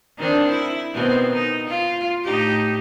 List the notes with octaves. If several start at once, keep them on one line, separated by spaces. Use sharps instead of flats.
D#3 C4 D4
E4
B2 D#3 C4
D#4
F4
A2 D#4 G4